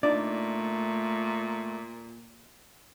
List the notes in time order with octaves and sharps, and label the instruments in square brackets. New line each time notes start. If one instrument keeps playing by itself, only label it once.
[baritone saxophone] A#2 [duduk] A3 [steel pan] D4 D#4 [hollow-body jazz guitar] D5